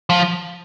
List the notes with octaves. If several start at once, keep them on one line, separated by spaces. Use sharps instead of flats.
F3